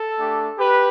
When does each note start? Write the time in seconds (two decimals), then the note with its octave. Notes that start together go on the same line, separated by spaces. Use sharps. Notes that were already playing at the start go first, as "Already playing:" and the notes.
Already playing: A4
0.18 A3 D4 G4
0.59 G4 B4